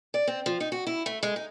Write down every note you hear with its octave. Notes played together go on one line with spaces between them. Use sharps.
D5
C4
F3
D#4
F#4
E4
A3
G#3
D#4